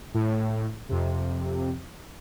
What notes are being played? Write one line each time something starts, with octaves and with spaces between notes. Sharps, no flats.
A2
F2 C3